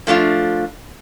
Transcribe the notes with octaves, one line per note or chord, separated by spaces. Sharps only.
F3 A3 D4 F4